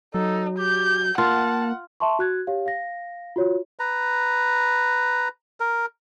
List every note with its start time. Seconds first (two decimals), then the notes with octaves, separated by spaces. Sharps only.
0.14 F#3 D#4 A4
0.59 G4 G6
1.18 A#3 F4 F#5 A5
2.00 E5 A5 C6 C#6
2.19 F#4 F#6 G#6
2.47 G4 C#5 F5
2.66 F5 A#6
3.36 F4 F#4 C#5
3.79 B4 A#5
5.60 A#4